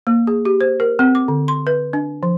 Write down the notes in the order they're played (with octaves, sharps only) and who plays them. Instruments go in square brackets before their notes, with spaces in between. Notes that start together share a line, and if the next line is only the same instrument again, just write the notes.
[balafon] A#3
G#4
G4
C5
A#4
C4
D6
D3
C6
B4
D4
F3